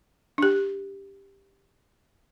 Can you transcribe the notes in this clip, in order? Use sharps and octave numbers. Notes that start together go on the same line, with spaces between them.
D4 G4